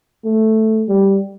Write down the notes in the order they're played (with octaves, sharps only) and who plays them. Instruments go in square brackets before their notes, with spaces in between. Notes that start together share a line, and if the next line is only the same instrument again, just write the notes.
[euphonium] A3
G3